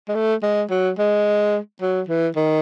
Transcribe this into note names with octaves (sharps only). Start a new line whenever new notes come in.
G#3
A3
G#3
F#3
G#3
F#3
E3
D#3